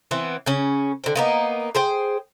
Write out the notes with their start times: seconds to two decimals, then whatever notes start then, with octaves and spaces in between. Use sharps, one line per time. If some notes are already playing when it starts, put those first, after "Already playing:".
0.11 E3 B3 C4
0.46 C#3 C#4
1.04 D3 C4
1.15 A#3 B3 D#4
1.75 G#4 C5 G5